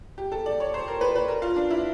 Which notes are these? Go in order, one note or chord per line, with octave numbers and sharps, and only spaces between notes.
G4
A4
D5
C#5
C5
A#4
B4
B4
A#4
F4
D4
E4